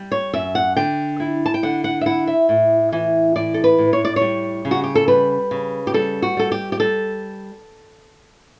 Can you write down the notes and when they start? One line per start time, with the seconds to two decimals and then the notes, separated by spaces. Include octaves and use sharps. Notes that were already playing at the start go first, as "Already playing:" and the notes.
Already playing: G3
0.12 C#5
0.33 F#2 E5
0.55 F#5
0.76 D3 G5
1.20 E4
1.46 A5
1.54 G5
1.63 D3 F#5
1.84 F#5
2.01 E5
2.06 E4 F#5
2.27 E5
2.49 A2
2.92 E3
3.36 A2 D5
3.54 A4
3.64 B4
3.78 A2
3.93 C#5
4.05 D5
4.16 C#5
4.21 G3
4.65 C#3
4.71 F#4
4.84 G4
4.95 A4
5.08 G3 B4
5.51 C#3
5.87 G4
5.94 G3 A4
6.22 F#4
6.37 G3 A4
6.52 G4
6.72 G4
6.80 G3 A4